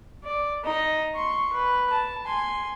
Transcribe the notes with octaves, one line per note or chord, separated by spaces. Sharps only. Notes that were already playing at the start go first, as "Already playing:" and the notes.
D5
D#4 D#5
C6 C#6
B4
A5
G#5 C6